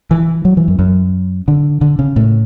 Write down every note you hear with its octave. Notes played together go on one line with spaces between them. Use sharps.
E3
F#3
E3
F#2
F#2
D3
D3
C#3
A2